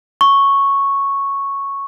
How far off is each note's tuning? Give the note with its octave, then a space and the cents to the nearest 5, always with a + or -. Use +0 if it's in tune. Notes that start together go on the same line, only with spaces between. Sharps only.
C#6 -5